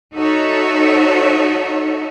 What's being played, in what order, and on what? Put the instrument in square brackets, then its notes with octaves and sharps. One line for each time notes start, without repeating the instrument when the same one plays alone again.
[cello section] D#4 F#4 A4 C#5 E5